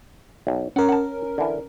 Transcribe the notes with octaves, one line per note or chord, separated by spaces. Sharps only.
B1
C#4 A#4 F#5
F#5 A5
D3 E3